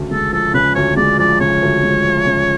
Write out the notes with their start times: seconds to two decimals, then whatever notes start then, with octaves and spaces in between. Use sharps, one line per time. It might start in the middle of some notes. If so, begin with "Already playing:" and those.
Already playing: D2 C#3
0.11 G#3 A4
0.33 F3 A4
0.54 C#3 B4
0.75 D2 C#5
0.97 G#3 D5
1.19 F3 D5
1.40 C#3 C#5
1.62 D2
1.83 G#3
2.05 F3
2.26 C#3